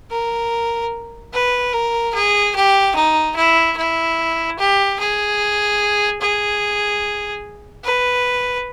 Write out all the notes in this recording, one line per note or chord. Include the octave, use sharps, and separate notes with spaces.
A#4
B4
A#4
G#4
G4
D#4
E4
E4
G4
G#4
G#4
B4